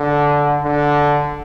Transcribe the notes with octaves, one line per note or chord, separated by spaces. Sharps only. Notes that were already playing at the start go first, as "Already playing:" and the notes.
Already playing: D3
D3